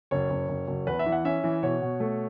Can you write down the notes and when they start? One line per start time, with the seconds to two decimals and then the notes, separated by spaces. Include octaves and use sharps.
0.11 F#1 C#5
0.30 F#1
0.49 F#1
0.67 F#1
0.87 E2 B4
0.99 E5
1.06 E3
1.12 F#5
1.25 C#4 E5
1.44 E3
1.63 B2 C#5
1.82 B2
2.00 A3